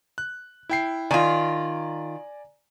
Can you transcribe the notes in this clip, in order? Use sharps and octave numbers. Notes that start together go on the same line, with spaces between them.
F#6
E4 G5 C7
D#3 F4 D5 G#5 A#5